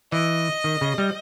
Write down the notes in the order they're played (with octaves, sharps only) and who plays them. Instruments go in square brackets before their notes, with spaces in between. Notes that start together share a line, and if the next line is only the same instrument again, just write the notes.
[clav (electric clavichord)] E3 [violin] D#5
[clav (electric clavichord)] D#3
C#3
G3